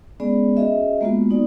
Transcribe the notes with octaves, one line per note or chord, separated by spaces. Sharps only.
G#3 B3 C#4 G#4 D5
C#4 F#4 G#4 D#5 E5
G#3 A#3 B3 F4 F#4
B3 D#4 D5